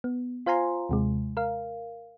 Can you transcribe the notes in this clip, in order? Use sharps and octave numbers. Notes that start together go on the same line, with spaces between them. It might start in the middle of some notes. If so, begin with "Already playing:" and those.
B3
F4 C5 F5 G#5 A#5 C6
D#2 C3 G#3
A#4 F5